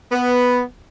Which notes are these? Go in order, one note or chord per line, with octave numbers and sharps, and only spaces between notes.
B3